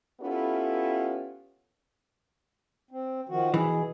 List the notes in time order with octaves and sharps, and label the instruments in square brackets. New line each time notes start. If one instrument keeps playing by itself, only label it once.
[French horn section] B3 C#4 E4 F4 G4 A4
[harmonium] C4
D#3 F3 F#4
[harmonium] B2 G#4 [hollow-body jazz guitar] E3